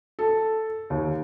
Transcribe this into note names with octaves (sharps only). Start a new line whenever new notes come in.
A4
D#2